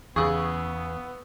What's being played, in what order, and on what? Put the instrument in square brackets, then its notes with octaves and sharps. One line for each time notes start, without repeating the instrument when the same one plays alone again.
[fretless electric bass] E2 [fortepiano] C#3 G#4 [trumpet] B3 [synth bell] C#6 D#6 E6